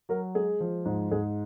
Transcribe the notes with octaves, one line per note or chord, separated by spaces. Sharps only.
F#3 A#4
G#3 G#4
F3
G#2
G#2 G#4